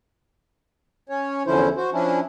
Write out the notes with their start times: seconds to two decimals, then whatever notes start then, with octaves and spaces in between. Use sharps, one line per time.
1.09 C#4 C#5
1.46 E2 D3 F3 C#4 E4 C5
1.77 F#4 C5
1.93 F3 C#4 D4 E4